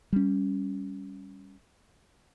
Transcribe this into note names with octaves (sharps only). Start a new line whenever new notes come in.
G3 C#4